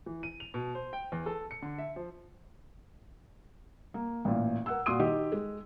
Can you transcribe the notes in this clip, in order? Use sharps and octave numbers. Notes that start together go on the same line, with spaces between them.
E3
D#7
F7
B2
C5
G5
E2
A4
C#7
D3
E5
F3
A#3
A1 A#2
A#4 F#5 E6
A#2 F#4 C6 D#6 D#7
D#3 G4 D#5
G#3